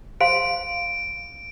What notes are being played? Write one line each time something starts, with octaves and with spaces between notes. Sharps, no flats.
C5 F5 C6 D7